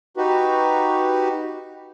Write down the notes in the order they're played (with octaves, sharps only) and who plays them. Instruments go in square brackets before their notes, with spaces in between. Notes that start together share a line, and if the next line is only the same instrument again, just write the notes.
[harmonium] D#4 F#4 G4 B4